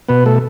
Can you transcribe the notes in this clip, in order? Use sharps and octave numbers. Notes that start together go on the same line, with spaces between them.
B2 B3 B4
A3 A4